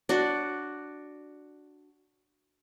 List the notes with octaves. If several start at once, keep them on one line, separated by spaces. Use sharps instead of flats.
D4 F#4